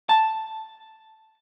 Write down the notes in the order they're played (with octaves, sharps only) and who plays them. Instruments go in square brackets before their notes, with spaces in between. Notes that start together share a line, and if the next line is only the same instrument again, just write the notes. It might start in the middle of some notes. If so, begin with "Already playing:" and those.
[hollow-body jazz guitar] A5